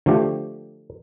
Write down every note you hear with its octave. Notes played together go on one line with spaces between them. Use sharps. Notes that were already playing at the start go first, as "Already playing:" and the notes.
D3 F3 A3 G4